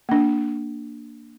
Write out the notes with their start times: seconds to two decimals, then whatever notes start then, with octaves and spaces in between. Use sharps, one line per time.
0.09 A#3 D4